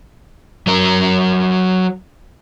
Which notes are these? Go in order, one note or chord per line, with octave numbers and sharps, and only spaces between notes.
F#3 A#4